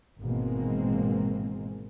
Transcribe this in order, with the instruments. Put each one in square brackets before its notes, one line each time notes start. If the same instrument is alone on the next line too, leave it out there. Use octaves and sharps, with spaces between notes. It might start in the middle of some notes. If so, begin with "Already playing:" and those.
[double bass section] G#1 B2 E3 G#3 A#3 C4